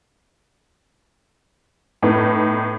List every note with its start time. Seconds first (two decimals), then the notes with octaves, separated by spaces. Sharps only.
2.02 A2 B3 D#4